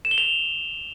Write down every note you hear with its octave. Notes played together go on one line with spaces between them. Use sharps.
E7
G7
F7